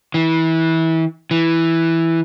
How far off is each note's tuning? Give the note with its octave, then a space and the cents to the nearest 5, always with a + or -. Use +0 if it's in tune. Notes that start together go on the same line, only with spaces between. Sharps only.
E3 -25
E3 +0